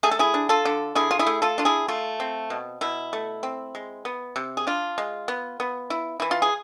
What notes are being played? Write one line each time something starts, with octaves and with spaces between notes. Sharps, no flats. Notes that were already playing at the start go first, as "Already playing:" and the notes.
A3 G#4
A4
E4 G#4
D4
F4 A4
D3
D3 E4 G#4
F4
E4 G#4
A3
F4 A4
D4 F4
E4 G#4
A3 F4
C4
B2
B2 E4
A3
C4
G#3
B3
C3
G#4
D4 F4
G#3
B3
B3
E4
E3 E4
F4
G#4